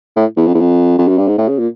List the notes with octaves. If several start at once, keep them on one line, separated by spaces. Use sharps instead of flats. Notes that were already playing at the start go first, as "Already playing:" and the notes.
A2
E2
F2
E2
F2
F2
F#2
G2
G#2
A2
C#3
A#2